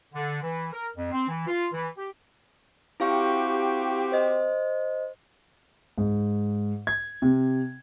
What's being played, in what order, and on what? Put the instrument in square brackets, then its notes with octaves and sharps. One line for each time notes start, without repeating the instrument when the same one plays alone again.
[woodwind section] D3
E3
A#4
F2
C4
E3
F4
E3
G4
[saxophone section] C4 F#4 G4 [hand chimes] E4 F5 C#6
[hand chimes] C5 D#5
[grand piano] G#2
G#6
C3